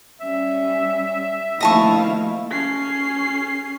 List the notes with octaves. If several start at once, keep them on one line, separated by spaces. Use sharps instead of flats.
G3 C#4 E5
F3 A3 A#3 E4 D#5 F5 A5 C#6
C#4 C7